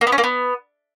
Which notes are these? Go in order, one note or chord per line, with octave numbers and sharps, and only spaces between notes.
A#3
B3
C#4
A#3
B3